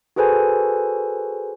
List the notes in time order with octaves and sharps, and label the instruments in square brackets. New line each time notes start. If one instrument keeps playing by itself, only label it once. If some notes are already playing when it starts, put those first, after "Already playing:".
[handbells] F#4 G#4 A4 B4 C5 G#5